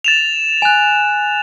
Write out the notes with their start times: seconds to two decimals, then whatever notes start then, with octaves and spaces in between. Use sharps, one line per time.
0.04 A6 E7 F7
0.62 G#5 F#6